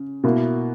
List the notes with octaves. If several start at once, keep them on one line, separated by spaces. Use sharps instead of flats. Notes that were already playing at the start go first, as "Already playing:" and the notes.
Already playing: C#3
B2 A#3 E4